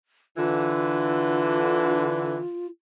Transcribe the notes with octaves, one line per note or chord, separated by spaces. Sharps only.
D3 E3 F4